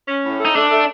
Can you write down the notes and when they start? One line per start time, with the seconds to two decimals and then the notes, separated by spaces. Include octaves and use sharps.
0.08 C#4
0.25 A2
0.40 A3
0.45 D#4
0.55 A3 D4
0.71 A3